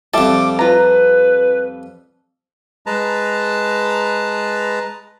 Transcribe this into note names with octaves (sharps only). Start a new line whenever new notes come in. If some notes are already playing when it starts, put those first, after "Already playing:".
F2 G3 A4 E5 D6
F4 B4 A#5
G#3 B4 A5 A#5